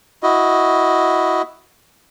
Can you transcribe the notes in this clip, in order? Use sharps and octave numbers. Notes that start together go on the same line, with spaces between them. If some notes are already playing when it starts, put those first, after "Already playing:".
E4 F#4 D#5